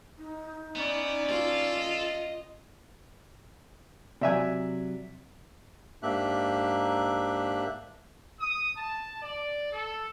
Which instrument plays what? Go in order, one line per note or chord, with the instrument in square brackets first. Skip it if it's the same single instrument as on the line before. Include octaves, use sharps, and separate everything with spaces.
[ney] D#4
[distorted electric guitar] B3 [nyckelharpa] C#4 D5
[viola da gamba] F4 [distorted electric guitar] A4
[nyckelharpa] D#5
[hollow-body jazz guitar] C3 F#3 [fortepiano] D5 E5 G#5
[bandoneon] G#2 A#3 D4 G4 E5 F#6
[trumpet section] D#6
A5
D5
A4